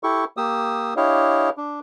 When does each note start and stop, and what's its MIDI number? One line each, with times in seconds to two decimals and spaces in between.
0.03 0.25 64
0.03 0.25 67
0.03 0.25 69
0.03 0.25 85
0.37 0.94 58
0.37 0.94 67
0.37 0.94 87
0.37 0.94 88
0.97 1.50 62
0.97 1.50 64
0.97 1.50 67
0.97 1.50 73
0.97 1.50 75
0.97 1.50 77
1.57 1.80 62